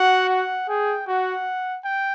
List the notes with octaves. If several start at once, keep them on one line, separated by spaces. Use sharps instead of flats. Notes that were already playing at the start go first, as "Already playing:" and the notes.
Already playing: F#4 F#5
F#5
G#4 G5
F#4 F#5
G5